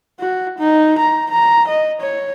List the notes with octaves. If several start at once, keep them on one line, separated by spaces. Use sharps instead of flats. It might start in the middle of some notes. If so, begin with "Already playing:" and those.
F#4
D#4
A#5
A#5
D#5
C#5